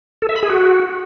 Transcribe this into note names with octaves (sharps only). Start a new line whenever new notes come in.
A4
E5
B5
G#4
F#4